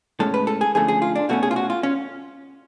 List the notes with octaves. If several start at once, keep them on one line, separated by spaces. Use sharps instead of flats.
A2 G#3 C#4 A4
B4
A4
G#4
D3 F3 A3 C#4 G#4
G#4
F4
D4
B2 A3 C#4 F#4
G#4
F4
F#4
F4
C#4